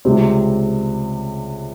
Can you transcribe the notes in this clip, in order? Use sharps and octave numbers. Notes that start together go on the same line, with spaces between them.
C#2 C3 G3 C4